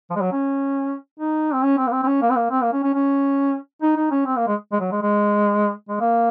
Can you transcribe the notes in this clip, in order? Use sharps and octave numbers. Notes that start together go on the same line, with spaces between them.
F3
G#3
F#3
C#4
D#4
C4
C#4
C4
A#3
C4
C4
C#4
A#3
C4
A#3
C4
A#3
C#4
C#4
C#4
D#4
D#4
C#4
C4
A#3
G#3
G#3
F#3
G#3
G#3
G#3
A#3